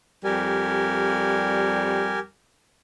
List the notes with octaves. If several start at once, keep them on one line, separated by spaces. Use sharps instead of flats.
F2 G3 G4 A#4 G#5